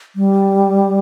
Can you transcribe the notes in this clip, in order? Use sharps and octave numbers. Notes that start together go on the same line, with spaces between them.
G3